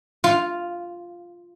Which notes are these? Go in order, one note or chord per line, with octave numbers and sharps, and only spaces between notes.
F4